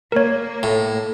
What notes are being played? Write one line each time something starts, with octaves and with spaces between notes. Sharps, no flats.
A#3 A#4 C#5
A2